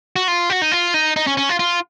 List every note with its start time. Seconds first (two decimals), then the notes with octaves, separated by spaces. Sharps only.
0.16 F#4
0.28 F4
0.50 F#4
0.62 D#4
0.72 F4
0.94 D#4
1.16 D#4
1.27 C#4
1.37 C#4
1.49 F4
1.59 F4